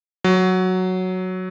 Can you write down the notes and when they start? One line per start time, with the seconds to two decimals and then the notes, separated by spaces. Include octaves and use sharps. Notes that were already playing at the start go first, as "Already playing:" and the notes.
0.24 F#3